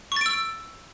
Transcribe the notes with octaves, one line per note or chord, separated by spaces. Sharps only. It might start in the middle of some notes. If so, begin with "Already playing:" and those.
C#6 E6 A6 D7